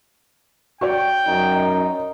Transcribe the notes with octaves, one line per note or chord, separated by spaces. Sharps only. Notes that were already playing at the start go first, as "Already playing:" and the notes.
F#4 C#5 D5 G5
F#2 D#4